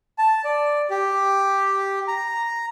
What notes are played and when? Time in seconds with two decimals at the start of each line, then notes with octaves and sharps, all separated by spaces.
0.18 A5
0.44 D5
0.90 G4
2.08 A#5